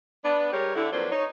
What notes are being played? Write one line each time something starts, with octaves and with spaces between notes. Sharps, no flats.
B3 D4
G3 G#3 G4 A#4 C#5
D3 E4
F2 F#3 A#3 D4 B4 C5
D#4 C#5